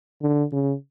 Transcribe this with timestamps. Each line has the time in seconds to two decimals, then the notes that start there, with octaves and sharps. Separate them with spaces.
0.22 D3
0.52 C#3